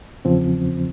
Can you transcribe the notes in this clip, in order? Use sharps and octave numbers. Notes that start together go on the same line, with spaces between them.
E2 C#3 F3 C4